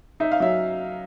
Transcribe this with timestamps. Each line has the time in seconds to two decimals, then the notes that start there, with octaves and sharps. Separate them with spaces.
0.20 D#4 E5
0.31 F5
0.40 F#3 E5